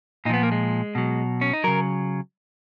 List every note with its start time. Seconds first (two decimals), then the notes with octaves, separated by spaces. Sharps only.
0.25 A#2 D#4
0.29 F3 B3
0.43 A#3
0.52 G#3
0.95 B2 F#3
1.41 C#4
1.53 D#4
1.64 C#3 F#3 A#4